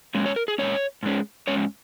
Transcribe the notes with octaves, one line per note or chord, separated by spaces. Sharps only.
A#2 G#3 C#4
C#5
A#4
G#4
A#2 G#3 C#4 C#5
G#2 G#3 C#4
G#2 G#3 C#4 C#5